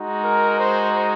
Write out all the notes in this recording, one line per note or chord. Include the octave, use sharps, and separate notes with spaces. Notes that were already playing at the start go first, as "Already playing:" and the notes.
Already playing: G#3 D#4 F#4
A#4
C5